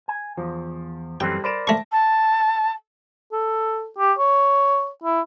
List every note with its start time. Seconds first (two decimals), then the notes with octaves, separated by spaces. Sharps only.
0.08 G#5
0.37 E2 F3
1.20 F#2 E3 G3 C4 A4 G5
1.44 A#4 C5 D5 B5 D7 E7
1.67 A3 A5 C#6 A#6
1.92 A5
3.32 A4
3.99 G4
4.19 C#5
5.04 E4